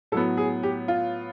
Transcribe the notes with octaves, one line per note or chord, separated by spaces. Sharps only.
A2 F#3 B3 A4
G#4
G4
F4